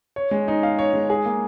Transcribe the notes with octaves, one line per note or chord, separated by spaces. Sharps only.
C#5
G#3
D#4
F5
C#5
G#3
G#4
A#3